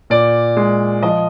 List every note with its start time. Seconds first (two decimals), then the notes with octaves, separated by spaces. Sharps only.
0.10 A#2 D5
0.57 G#3
1.03 F3 D#5